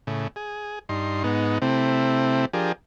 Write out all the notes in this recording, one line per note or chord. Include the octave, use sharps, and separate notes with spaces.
A2 C#3
G#4
G2 D#4 C6
G#2 B3 D#4
C3 A3 C4 E4
F3 D4 G4 G#4 A#4